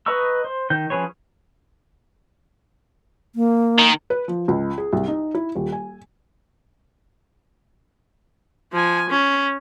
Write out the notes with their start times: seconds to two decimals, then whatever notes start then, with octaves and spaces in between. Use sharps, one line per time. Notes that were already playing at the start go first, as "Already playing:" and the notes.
0.06 B4 D#5 A#5 C#6 E6
0.44 C5
0.70 D#3 G6
0.90 F3 C#4 G#4 B4 C#5
3.35 A#3
3.79 D#3
4.10 B4
4.28 F3
4.48 C#2
4.78 G#4
4.93 C2
5.08 D#4
5.34 E4
5.55 D#1
5.72 G#5
8.73 F3 G#5
9.10 C#4